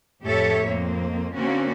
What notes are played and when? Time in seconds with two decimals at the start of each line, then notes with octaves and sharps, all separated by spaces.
0.24 F2 A2 G4 A4 C#5 E5
0.67 F2 A#3 C4
1.35 D3 A#3 C4 C#4 F#4